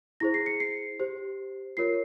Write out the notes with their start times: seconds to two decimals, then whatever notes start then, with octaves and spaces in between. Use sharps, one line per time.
0.20 E4 G#4 C5 A#6
0.34 C7
0.46 C#7
0.60 C7
0.99 G4 C5
1.77 F4 A#4 C#5 C7